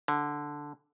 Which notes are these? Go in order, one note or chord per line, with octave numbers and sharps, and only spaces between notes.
D3